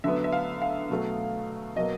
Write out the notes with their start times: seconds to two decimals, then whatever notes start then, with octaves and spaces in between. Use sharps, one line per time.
0.04 D3 F#3 B3 E5
0.24 E5
0.32 F5
0.62 F5
0.90 B2 F#3 A3
1.76 B2 F#3 A#3 D#5